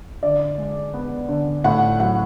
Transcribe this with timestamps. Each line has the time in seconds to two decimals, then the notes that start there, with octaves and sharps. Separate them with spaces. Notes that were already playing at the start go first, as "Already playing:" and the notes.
0.23 D3 D5
0.58 G#3
0.93 B3
1.29 D3
1.64 A2 F#5
2.00 F#3 F#5